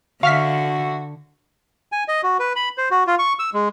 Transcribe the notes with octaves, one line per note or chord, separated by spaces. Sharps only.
D3 F#4 E5 F5 C#6 F6 B6
G#5
D#5
F#4
B4
B5
C5
F#4
F4
C#6
E6
G#3